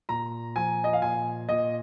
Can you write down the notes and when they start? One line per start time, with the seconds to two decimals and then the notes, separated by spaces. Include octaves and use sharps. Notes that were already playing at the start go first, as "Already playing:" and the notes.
0.09 A#2 A#5
0.56 F3 G#5
0.84 D#5
0.93 F5
1.02 A#2 G#5
1.49 A#2 D#5